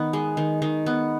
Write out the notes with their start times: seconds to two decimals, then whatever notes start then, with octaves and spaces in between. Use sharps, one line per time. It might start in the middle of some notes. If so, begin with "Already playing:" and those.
Already playing: D#3 B3
0.13 G#3
0.37 D#3
0.62 D#3
0.86 B3